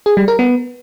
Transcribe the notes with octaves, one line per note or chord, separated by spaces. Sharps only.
G#4
G3
A#4
B3